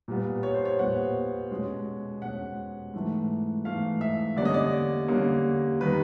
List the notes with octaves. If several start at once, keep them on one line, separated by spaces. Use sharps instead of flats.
A#2 G3 B3
C#5
C5
C#5
A#2 G3 B3 F#5
B2 G#3 C#4
B2 G#3 C#4 F#5
G#2 E3 A3
G#2 E3 A3 F5
E5
D3 G3 A#3 C#4 D5
D#5
D5
D3 G3 A#3 C#4
D#3 G3 B4